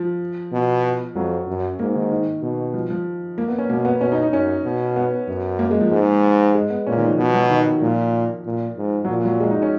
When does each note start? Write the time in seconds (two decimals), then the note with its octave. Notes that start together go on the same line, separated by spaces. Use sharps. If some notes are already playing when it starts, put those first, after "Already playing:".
Already playing: F3
0.52 B2
1.15 F2 F#3
1.48 F#2
1.79 G#2 A#3
1.95 D#3
2.11 D#3
2.42 B2
2.74 F3
2.90 F3
3.38 A#3
3.48 B3
3.58 C#4
3.69 B2 A#3
3.85 B3
4.00 B2 C#4
4.12 D#4
4.23 D#4
4.32 F#2 C#4
4.64 B2
4.96 B3
5.28 F#2
5.59 A#3
5.71 G#3
5.81 F3
5.92 G#2
6.55 G#3
6.70 B3
6.87 A#2 C#4
6.97 D#3
7.08 F3
7.18 B2 F3
7.34 F#3
7.50 D#3
7.81 A#2 F3
8.46 A#2
8.77 G#2
9.05 F#3
9.08 A#2 F3
9.25 F#3
9.40 G#3
9.51 D#4
9.62 C#4